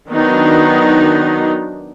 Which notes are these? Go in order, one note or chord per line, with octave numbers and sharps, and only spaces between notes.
D#3 F#3 B3 D4 D#4